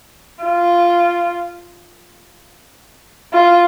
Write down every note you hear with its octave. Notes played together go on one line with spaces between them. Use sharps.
F4
F4